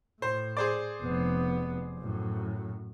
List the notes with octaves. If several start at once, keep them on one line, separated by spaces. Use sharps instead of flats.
A2 C5
G#4 C5 D5
F1 B3
F#2 A2